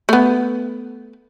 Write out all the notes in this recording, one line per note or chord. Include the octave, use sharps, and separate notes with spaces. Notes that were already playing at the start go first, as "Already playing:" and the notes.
A3 B3